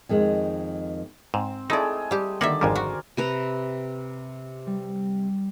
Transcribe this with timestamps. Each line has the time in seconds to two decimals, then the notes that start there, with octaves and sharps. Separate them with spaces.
0.09 F2 D#3 G#3
1.34 G#2 C4
1.70 G#3 A3 D#4 E4 G#4 D5
2.11 G3 G4
2.41 D3 D#3 A#3 D5 E5 F#5
2.61 G#1 F2 G3 A#4 C5 G#5
2.75 F#4
3.17 C3 B4 A#5
4.67 G3